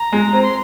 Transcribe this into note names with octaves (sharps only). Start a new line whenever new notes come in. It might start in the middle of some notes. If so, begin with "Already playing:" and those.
Already playing: A#5
G#3
C4
C6